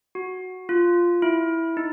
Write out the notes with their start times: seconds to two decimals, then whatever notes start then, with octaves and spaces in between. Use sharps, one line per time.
0.15 F#4
0.69 F4
1.22 E4
1.77 D#4